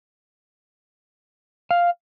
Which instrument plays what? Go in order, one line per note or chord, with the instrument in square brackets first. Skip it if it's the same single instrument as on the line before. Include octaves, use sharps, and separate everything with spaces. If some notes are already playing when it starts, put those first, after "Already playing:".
[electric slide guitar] F5